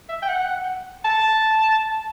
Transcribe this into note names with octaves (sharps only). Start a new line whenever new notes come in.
E5
G5
F#5
A5